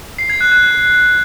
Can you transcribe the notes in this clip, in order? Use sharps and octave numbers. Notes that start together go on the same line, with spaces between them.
C7
G#6
F#6
F#6